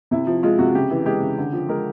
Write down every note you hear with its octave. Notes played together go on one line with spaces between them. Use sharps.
C3 E4
F3
G#3 F4
C3 F#4
C#3 G4
E3
G#3 G4
C#3
D3
F3
G#3 A#4